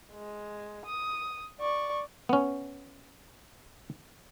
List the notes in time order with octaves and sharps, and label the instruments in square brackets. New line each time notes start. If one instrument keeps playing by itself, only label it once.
[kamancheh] G#3
D#6
D5 C#6
[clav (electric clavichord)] B3 C#4